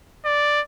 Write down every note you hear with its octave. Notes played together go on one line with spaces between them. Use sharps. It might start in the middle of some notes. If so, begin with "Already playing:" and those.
D5